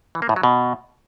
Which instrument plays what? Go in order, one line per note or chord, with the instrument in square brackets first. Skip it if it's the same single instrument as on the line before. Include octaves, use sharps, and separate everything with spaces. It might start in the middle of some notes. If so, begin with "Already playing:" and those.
[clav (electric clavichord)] E3
A#3
A2
F#3
B2